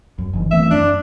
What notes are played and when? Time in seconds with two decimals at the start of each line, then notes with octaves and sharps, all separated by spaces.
0.18 F#2
0.33 F#1 D#3 E3
0.51 E3 A3 C4 E5
0.71 F#2 D4